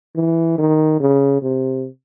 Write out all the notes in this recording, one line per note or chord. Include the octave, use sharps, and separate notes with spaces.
E3
D#3
C#3
C3